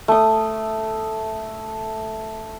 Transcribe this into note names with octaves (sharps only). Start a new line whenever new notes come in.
A3 D#6